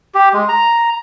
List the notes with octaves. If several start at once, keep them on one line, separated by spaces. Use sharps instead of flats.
G4
G#3
A#5